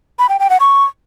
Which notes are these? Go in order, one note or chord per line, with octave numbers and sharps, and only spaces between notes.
B5
G5
G5
F#5
C#6